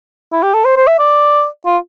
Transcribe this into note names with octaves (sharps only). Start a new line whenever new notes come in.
E4
G4
A4
C5
C5
E5
D5
F4